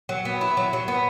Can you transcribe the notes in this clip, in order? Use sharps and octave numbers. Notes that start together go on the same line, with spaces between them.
F#3
B3
E4
F#3
F#3
B3